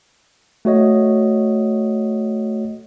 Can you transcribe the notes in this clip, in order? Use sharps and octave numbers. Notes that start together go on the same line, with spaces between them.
A3 F#4 C#5 D#5